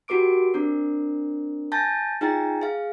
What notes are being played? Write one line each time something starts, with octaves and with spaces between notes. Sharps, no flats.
F#4 G4 A#4 D6 D7
C4 D4 A#4
G#5 A5 G6 A6 A#6
D#4 F4 G#4 G5 G#5 A#5
G#4 F5